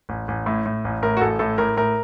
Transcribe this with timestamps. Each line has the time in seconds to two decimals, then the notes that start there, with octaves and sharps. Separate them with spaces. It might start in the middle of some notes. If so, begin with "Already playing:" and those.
0.09 A1
0.28 A1
0.46 A2
0.66 A2
0.85 A1
1.02 A2 A#4
1.17 F#4
1.21 A1 A4
1.39 A2 A4
1.58 A2 A#4
1.77 A2 A#4